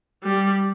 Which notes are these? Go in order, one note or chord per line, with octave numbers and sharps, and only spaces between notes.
G3